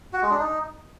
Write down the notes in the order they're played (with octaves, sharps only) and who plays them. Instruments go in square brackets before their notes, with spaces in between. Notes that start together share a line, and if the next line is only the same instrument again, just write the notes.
[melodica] F#4
G#3
D4
D#4